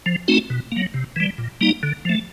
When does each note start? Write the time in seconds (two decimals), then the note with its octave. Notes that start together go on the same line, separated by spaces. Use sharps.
0.06 F3
0.28 A3 C4 D#4 F#4
0.50 B2
0.72 F#3 A#3
0.94 C3
1.16 E3 G3
1.38 A#2
1.61 G3 A#3 D#4
1.83 D3
2.05 F3 A3